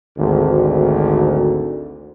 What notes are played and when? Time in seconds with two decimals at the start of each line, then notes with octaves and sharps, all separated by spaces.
0.17 G#1 D2